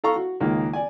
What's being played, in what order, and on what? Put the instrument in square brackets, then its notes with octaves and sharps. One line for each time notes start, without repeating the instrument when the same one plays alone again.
[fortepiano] A4 F5 A#5 C#6
F#4
C#2 D#3 G#3 A#3
D5 G#5